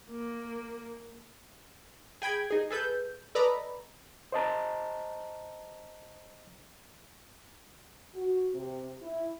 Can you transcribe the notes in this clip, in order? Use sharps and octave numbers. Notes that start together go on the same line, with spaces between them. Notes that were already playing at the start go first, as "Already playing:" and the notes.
A#3
G#4 G5 B5 G#6
D#4 G#4
G#4 A4 B4 G6
A4 B4 D5 D#5 A#5 B5
C5 D#5 A5 A#5
F#4
C3
E4